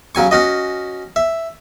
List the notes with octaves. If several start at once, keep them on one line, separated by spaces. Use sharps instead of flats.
C#3 F#3 G#5 C#6
C#4 F#4 D#5
E5